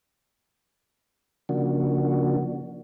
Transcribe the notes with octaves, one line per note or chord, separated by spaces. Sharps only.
C#3 F3 A#3 D4 F#4